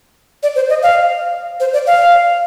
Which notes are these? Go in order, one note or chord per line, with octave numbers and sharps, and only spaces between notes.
D5
C5
D#5
F5
C5
D5
F5